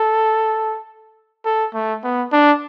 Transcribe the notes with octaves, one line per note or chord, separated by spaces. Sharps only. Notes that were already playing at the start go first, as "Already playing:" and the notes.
Already playing: A4
A4
A3
B3
D4